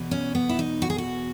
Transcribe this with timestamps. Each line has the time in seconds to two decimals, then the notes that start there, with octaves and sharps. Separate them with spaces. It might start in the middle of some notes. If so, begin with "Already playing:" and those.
Already playing: E2 B2
0.11 C#4
0.35 B3
0.49 E4
0.59 D#4
0.82 F#4
0.90 G#4
0.98 F#4